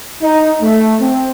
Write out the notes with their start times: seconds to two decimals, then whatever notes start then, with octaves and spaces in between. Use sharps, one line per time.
0.22 D#4
0.61 A3
1.00 C4